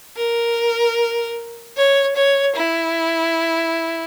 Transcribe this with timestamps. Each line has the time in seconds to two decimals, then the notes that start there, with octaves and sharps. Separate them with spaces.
0.17 A#4
1.77 C#5
2.16 C#5
2.56 E4